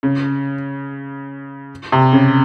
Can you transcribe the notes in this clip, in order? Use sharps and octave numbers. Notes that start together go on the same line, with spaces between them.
C#3
C3
C#3